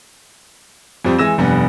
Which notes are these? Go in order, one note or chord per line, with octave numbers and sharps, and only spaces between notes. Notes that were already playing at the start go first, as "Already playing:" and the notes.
F2 F3 G3 C4
E3 G#3 G#5 E6 A#6 E7
F1 G2 B3